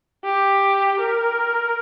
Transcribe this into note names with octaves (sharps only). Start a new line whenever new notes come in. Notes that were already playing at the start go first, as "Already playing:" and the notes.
G4
A#4